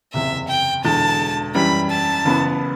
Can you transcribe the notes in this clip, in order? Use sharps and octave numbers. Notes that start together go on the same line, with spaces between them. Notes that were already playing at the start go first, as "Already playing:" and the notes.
F#1 E2 C3 E5
G5
E1 E2 D3 A5
F#2 E3 G3 B5
A5
F#1 F#2 E3 B3